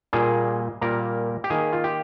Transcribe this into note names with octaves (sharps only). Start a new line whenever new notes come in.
A#2 G3 A#3 G#4
A#2 G3 A#3 A#4
G4
D#3 A#3 G#4
F4
G4